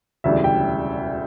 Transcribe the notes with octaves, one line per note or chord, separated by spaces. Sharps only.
E1 D2 C#3 E3 G3 E5
G5